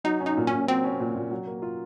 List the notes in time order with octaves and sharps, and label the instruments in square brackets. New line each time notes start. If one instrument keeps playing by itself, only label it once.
[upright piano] F#3 [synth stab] D#4
[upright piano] C#4
[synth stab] D#4
[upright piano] A#2
[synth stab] C#4
[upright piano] A#2
[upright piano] F#3 [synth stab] C4
[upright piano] C#4
A#2
A#2
F#3
A#3
F4